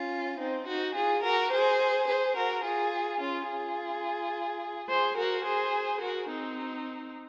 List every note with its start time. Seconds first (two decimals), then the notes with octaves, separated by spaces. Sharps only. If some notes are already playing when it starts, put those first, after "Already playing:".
Already playing: C#4 F4
0.39 C4 D#4
0.67 D#4 F#4
0.95 F4 G#4
1.23 F#4 A#4
1.51 G#4 C5
2.07 G#4 C5
2.36 F#4 A#4
2.64 F4 G#4
3.20 C#4 F4
3.48 F4 G#4
4.88 G#4 C5
5.17 F#4 A#4
5.45 G#4 C5
6.01 F#4 A#4
6.29 C4 D#4